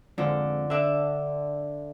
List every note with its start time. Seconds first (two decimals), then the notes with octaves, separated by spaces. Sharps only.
0.18 F2 G#2 D3 F3
0.70 D3 D4 E5